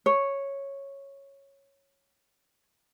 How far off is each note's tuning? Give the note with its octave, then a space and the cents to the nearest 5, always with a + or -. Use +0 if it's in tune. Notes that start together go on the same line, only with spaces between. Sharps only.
C#5 -5